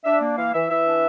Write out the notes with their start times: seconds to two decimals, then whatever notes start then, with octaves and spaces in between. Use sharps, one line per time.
0.05 D4 E5
0.21 A#3
0.37 E3 F5
0.54 E3 E5
0.70 E3 E5
0.87 D4